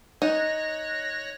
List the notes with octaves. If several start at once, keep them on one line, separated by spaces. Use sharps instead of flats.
D#4 C#5 F#6 A#6